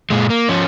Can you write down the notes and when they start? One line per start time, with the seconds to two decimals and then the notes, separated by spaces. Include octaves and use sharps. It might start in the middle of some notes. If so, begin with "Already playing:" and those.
0.10 A#2 G#3
0.30 A#3
0.49 F3 C#4